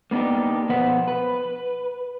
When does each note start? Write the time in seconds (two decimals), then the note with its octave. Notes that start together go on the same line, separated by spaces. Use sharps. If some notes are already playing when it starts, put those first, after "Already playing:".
0.11 A#3 B3 D4 D#4 G4
0.69 B2 F3 B3 B4 C5 F#5
1.08 B4